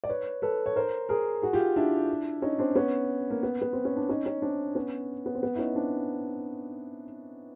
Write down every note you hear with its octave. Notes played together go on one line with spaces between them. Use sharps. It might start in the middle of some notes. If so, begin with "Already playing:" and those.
D5
B4 C#5
A4 B4
C#5
A#4 C5
G#4 A#4
F#4 G#4
F4 G4
D4 E4
C#4 D#4
C4 D4
B3 C#4
A#3
B3
B3
C4
C#4
D4
C#4 D#4
C#4 D#4
C4 D4
B3 C#4
B3 C#4
C4
B3
E4
C#4 D#4
C4 D4